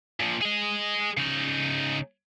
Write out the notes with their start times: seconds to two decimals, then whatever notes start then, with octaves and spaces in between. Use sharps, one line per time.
0.20 A#2 F3
0.41 G#4 D#5
1.17 C#3 D#4